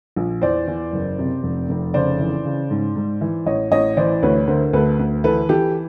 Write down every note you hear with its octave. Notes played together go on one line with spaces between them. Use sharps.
A#1
E2 C5 D5
E2
F#1
C3
F1
F1
C#3 C5 D5
E3
C#3
G#2
G#2
E3
A1 C#5 D#5
A1 C#5 D#5
E3 C5 D5
D2 B4 C#5
D3 A#4 C5
D2 A4 B4
D2
E3 A4 B4
E3 G4 A4